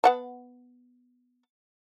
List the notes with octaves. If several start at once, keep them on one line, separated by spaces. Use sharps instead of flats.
B3 F#5 A5